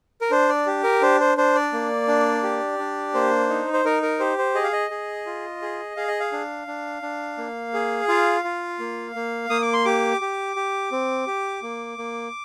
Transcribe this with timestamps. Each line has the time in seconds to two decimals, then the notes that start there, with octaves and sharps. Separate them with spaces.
0.21 A#4
0.31 D4 C5
0.49 D5
0.66 G4
0.84 A#4
1.02 D4 C5
1.20 C5
1.38 D4 C5
1.55 D5
1.73 A#3
2.08 D4
2.43 G4
2.79 D4
3.14 A#3 C5
3.49 D#4
3.73 C5
3.85 D#4 A#4
4.03 A#4
4.20 G4 C5
4.38 C5
4.55 G#4 D#5
4.64 F5
4.73 D#5
4.91 G#4
5.26 F4
5.62 G#4
5.97 G#4 F5
6.08 D#5
6.20 F5
6.32 D4
6.67 D4
7.02 D4
7.38 A#3
7.74 G#4
8.08 F4 F5
8.44 F4
8.79 A#3
9.15 A#3
9.50 A#3 D#6
9.62 D6
9.73 C6
9.85 G4 D6
10.21 G4
10.56 G4
10.92 C4
11.27 G4
11.63 A#3
11.98 A#3